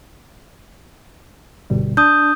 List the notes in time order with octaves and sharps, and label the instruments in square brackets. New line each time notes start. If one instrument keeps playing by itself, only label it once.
[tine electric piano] G1 B2 G3
[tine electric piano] D4 [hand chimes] D#6 G6